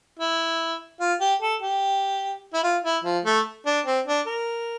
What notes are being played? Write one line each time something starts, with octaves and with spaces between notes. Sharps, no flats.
E4
F4
G4
A4
G4
E4
F4
E4
F3
A3
D4
C4
D4
A#4